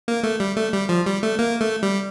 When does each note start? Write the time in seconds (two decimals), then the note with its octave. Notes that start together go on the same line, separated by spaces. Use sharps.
0.08 A#3
0.23 A3
0.40 G3
0.56 A3
0.73 G3
0.89 F3
1.06 G3
1.23 A3
1.39 A#3
1.60 A3
1.83 G3